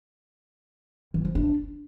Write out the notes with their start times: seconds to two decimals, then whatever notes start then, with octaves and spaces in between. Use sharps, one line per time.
1.14 E3
1.25 F3
1.35 D4